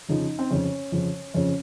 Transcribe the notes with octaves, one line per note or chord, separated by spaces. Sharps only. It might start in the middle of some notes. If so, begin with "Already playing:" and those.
F2 C#3 F3 D#4
C4
F2 C#3 F3 C#4
F2 C#3 F3
F2 C#3 F3 C#4